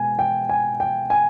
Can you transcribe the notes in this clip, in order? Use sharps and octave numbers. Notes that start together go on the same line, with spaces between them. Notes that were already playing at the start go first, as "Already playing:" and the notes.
Already playing: B2 G#3 G#5
G5
G#5
G5
G#5